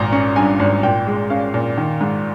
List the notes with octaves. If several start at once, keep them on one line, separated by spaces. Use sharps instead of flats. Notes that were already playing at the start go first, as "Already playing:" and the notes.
Already playing: G#1 A#2 A#5
C#4
G2 G#5
G#1
A#2 G5
G#3
C#4 F5
A#2
D#3
G#2